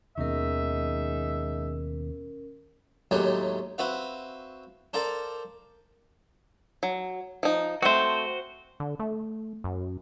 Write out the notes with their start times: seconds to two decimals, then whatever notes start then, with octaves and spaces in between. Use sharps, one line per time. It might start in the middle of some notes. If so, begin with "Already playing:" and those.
0.18 D#2 B2 D#3 G#3 C#4 D#4 A#4 E5
3.11 D#2 A2 F#3 G#3 A3 G4
3.78 C4 F#4 B4 E5 F5
4.93 A4 A#4 C5 D5 F5
6.83 F#3
7.43 F3 D#4
7.82 A3 C4 F#4 C5
8.80 D3
8.99 A3
9.64 F#2